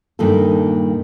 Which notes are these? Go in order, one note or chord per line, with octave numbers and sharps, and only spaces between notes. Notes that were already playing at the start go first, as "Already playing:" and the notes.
G2 A#2 D#3 A#3 A4